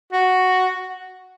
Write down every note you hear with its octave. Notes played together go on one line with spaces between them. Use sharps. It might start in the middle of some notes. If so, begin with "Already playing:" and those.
F#4